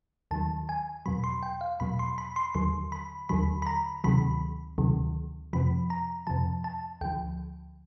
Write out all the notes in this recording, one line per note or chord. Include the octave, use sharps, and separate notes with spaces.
D#2 D#3 F#3 A5
G#5
E2 B2 F#3 B5
C6
G5
F5
E2 B2 F#3 B5
C6
B5
C6
D#2 D3 F#3 C6
B5
D#2 D3 F#3 B5
B5
A#5
D2 C3 D#3 F#3 B5
D2 C3 D#3 F#3
F2 C3 F3 B5
A#5
F2 C3 F3 A5
A5
D2 D3 F3 G5